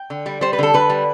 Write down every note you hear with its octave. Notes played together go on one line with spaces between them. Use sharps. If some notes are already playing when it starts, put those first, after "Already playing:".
Already playing: G5
D3
G3
G3 C5
B4
D3 A4
D3 B4
G3